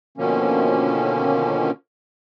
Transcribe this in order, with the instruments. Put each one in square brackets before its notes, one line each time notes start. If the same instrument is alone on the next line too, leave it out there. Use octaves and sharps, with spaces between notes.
[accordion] B2 D3 D#3 F3 A#3 C#4